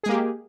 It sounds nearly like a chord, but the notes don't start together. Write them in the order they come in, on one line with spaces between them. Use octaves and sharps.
G#4 G#3 A#3 G4